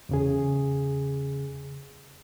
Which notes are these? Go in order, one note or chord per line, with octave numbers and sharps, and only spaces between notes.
E2 C#3 G#4